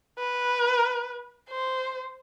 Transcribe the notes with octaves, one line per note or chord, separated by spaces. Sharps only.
B4
C5